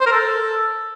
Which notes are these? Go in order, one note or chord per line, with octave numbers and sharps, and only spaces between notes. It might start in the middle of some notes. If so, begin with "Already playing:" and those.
C5
A#4
A4